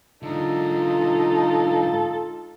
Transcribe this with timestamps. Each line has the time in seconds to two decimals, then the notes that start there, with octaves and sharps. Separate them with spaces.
0.23 G#2 D3 D#4 F4 A4